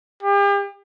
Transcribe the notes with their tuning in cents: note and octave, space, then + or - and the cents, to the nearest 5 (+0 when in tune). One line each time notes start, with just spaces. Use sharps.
G4 +40